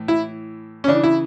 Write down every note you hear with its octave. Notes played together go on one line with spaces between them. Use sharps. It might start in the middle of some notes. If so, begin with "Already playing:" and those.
Already playing: A2 E3
E4
C#4
C#3 E3 D4
E4